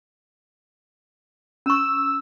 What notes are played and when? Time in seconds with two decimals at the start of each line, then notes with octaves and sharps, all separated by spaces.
1.66 C#4 C#6 E6